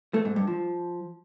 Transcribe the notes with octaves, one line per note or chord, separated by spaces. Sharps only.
A3
G#2
G2
F3